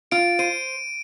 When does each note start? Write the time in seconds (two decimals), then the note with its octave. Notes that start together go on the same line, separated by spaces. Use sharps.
0.11 F4 D7
0.39 C5 D#7